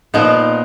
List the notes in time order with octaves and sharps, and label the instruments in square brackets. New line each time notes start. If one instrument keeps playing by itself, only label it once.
[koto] A#2 F3 B3 [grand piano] D#4